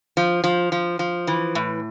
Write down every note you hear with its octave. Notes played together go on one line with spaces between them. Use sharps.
F3
F3
F3
F3
E3
A2